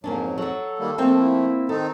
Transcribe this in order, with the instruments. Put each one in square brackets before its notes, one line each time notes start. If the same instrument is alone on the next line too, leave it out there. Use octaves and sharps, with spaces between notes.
[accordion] F2 G#2 [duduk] F#3 [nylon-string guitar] A#3 C#4 D4
[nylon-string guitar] F#3 F#4 [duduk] A4
[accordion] D#3 G3 A#3
[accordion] F3 A3 [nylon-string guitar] A#3 C4 G5
[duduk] E4
[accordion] D#3 C4 D#4 [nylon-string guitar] A4